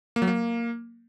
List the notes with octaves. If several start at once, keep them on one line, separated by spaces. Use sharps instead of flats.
A#3
F#3
A#3